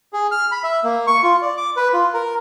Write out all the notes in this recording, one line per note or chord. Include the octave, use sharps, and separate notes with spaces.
G#4
F6
B5
E5
A#3
C#6
F4
D5
D6
B4
F4
A#4